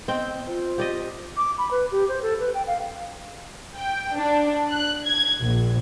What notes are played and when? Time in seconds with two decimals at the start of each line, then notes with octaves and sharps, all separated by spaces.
0.08 B3 C4 D#5 G5
0.47 F4 C5
0.78 G4 D5 D#5
1.37 D6
1.58 B5
1.71 B4
1.92 G4
2.08 C5
2.22 A4
2.40 B4
2.54 G5
2.67 F5
3.76 G5
4.17 D4
4.70 F#6
5.05 G#6
5.42 A#1